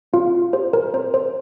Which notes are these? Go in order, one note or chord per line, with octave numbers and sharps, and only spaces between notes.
C4 F4 F5
G4 C5
A#4
C4 C5
C5